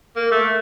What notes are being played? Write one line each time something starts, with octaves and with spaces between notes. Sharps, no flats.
A#3
A3